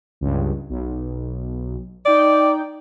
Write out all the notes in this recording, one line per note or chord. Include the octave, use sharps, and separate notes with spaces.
C#2 G2
B1
D#4 D5 G5